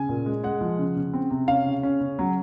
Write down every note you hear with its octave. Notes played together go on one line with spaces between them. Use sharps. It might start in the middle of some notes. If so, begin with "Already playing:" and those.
Already playing: C#3 G#5
A#2
G#3
G#3 F#5
F3
C#3
C#3
C4
C3
C#4 F5
C#3
C#4
C#3
F#3